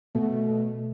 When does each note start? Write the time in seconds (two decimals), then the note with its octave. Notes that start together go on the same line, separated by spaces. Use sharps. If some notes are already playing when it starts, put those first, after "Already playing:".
0.15 B2 A3